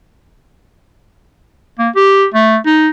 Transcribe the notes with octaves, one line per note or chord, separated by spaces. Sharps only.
A#3
G4
A3
D#4